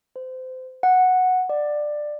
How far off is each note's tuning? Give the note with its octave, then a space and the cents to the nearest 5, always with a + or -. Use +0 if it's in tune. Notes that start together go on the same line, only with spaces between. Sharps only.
C5 -25
F#5 -5
D5 +15